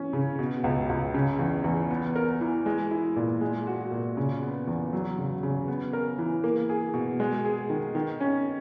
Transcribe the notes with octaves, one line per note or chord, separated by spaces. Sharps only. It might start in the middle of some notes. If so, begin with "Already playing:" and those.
Already playing: E3 C#4
C#3
B2
C#2
C#2
C#3
E2
E2
B3
A#4
E3
G#3
E4
A#2
G#3
F#4
A#2
C#3
B3
E2
F#3
C#3
C#3
B3
A#4
E3
A#3
G#4
B2
G#3
G#4
D#3
D#3
C#4